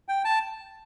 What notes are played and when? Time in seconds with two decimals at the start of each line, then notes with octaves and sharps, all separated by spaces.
0.08 G5
0.25 A5